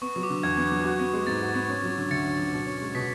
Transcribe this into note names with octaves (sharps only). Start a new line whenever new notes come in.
B3 C#6
F#3
D6
D3
E2 G#6
B3
F#3
F#4
B3
G#3
G#2 A6
F#4
B3
C#4
F#3
D3
D2 A6 C#7
C#4
F#3
B2
C#4
G#3
B2 B6